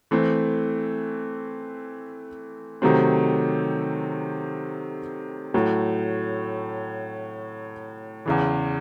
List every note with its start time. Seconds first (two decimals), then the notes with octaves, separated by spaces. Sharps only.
0.11 E3 A3 C4
2.82 C3 D#3 F#3 A3 C4
5.54 A2 F#3 A3
8.26 E2 C#3 E3